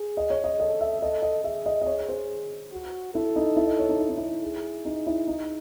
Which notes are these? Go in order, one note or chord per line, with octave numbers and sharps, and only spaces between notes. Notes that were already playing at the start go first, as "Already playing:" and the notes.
Already playing: G#4
D#5
C#5
D#5
A4 D#5
E5
A4 D#5
D#5
G#4 E5
D#5
D#5
C#5
C5
F#4
E4 A4
D#4
E4
D#5
C#5
D#4
E4
D#4
E4
G#4
D#4
E4
D#4